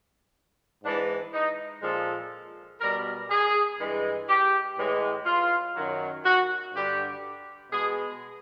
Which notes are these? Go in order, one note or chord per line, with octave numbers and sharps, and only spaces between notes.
G#2 E3 G#3 D4
D#4
A#2 F3 G#3 A4
B2 G3 A#4
G#4
G2 E3 G#3
G4
A2 E3 G#3
F4
F#2 D#3 F#3
F#4
G2 D3 G3 G4
B2 G#3 G#4